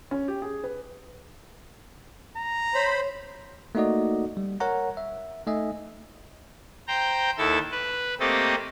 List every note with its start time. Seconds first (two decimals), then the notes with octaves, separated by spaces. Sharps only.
0.11 C#4
0.28 G4
0.42 G#4
0.64 B4
2.37 A#5
2.74 C5 C#5 B5
3.75 A3 A#3 D#4 F#4 D5 D#5
4.37 G3
4.60 A#4 C#5 F#5 A#5
4.97 E5
5.47 A3 D#4 D#5 E5 G#5
6.88 C5 G5 A#5
7.38 D#2 E4 A4 E6
7.71 B4
8.20 A3 A#3 C4 G4 A4 D#5